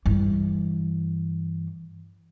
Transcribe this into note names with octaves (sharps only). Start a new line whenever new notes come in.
G2 E3